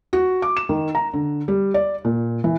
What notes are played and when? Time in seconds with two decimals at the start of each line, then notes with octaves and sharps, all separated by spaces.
0.13 F#4
0.42 D6
0.57 E7
0.69 D#3
0.95 A#5
1.13 D3
1.48 G3
1.74 D5
2.05 A#2
2.44 E3